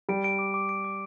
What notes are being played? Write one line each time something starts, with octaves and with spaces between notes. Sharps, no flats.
G3 D7
D7
D6
D6
D7
D6